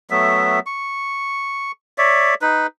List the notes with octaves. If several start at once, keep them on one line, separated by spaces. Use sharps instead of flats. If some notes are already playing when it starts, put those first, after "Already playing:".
F#3 A3 B3 E5
C#6
C#5 D5 E5
D#4 B4